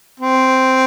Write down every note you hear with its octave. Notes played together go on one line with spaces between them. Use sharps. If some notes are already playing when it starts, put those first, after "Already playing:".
C4